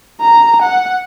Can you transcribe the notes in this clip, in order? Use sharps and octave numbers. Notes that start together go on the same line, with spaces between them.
A#5
F#5